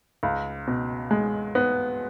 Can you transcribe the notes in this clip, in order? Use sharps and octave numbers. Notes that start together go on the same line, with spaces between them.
C#2
B2
G#3
B3